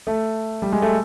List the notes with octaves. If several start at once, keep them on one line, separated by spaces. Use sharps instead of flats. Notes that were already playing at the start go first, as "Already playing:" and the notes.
A3
G3
G#3
A3